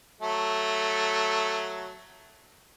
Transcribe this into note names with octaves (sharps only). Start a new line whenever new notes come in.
F#3 A3